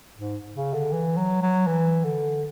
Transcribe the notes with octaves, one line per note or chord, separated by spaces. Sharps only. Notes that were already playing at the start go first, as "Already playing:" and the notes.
G#2
C#3
D3
E3
F#3
F#3
E3
D3